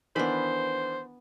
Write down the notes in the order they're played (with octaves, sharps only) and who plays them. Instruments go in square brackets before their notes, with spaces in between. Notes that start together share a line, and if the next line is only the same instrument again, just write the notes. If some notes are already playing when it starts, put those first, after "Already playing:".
[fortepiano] D#3 E3 D4 [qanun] B3 B5 [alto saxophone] C5